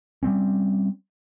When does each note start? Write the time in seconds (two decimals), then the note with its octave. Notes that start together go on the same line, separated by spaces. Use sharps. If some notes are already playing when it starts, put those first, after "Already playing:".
0.23 G3 G#3 C4 C#4